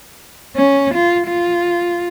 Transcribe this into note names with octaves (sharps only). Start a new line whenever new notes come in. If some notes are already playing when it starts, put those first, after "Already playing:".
C#4
F4
F4